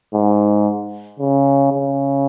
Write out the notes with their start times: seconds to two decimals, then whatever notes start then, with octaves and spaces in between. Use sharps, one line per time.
0.13 G#2
1.19 C#3
1.73 C#3